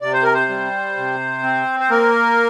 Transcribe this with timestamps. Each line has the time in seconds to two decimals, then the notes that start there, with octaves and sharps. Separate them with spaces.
0.02 C3 D5
0.13 C5
0.23 A#4
0.34 C5
0.49 G3
0.97 C3
1.43 C4
1.80 C5
1.90 A#3 A#4